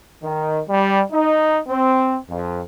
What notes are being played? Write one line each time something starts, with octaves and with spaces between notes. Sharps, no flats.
D#3
G3
D#4
C4
F2